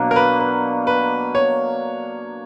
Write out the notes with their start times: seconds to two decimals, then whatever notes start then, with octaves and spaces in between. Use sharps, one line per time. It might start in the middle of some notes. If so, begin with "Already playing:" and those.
Already playing: B2 F#3 A#3 D4
0.11 A#4
0.16 B4
0.40 B4
0.87 B4
1.35 C#5